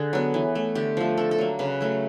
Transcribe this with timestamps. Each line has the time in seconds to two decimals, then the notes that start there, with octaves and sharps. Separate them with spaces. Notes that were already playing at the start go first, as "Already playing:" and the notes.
Already playing: D3 G#4
0.13 F#3 B3
0.34 E3
0.55 A3
0.75 D3 G4
0.97 F3 A3
1.18 D3 A4
1.31 A4
1.38 F#3 A#3
1.59 C#3 B4
1.81 F#3 A3